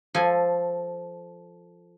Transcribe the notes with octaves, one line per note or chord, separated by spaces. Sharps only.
F3 A4 G#5